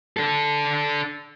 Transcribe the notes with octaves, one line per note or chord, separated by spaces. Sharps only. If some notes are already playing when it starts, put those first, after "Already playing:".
D4 A4